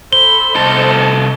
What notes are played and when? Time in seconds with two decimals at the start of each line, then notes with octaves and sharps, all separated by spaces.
0.13 A4 C5 B5 G7
0.56 C2 A4 D#5 A5